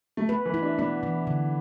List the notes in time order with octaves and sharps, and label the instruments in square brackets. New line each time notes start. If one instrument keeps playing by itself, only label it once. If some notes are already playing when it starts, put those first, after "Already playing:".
[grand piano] A3
[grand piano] B3 [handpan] B4
[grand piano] E3
[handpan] E4
[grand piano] D4
[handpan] B3 [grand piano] D4
[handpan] E3
D3